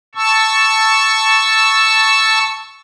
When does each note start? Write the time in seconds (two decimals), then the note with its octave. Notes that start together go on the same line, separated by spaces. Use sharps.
0.15 A5 C#6 E6